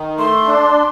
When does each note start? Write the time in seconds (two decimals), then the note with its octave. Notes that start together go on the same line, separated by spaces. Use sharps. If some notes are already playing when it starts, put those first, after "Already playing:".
Already playing: D#3
0.18 A3 C6
0.47 D4